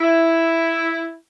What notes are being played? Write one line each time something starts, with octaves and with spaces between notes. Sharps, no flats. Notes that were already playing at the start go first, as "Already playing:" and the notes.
E4